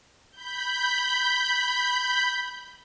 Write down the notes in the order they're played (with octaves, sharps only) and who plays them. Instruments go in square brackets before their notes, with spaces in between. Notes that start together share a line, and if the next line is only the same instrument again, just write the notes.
[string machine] B5 G6